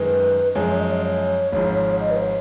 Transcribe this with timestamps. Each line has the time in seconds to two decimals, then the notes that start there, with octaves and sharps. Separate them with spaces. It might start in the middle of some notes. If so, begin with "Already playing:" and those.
Already playing: F#2 D#3 G#3 B4
0.55 F#2 F3 G#3 C#5
0.68 C#5
0.79 D#5
0.92 C#5
1.04 C#5
1.52 G#1 G#2 F3
2.00 D#5
2.11 B4
2.17 C#5